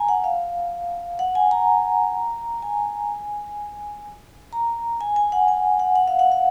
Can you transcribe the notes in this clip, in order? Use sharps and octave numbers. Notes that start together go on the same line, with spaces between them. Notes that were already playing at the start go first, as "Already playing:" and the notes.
Already playing: G#5 A#5
F#5
F5
F#5
G#5
A#5
G#5
A#5
G#5
G#5
F#5
G#5
F#5
F#5
F5
F#5
F5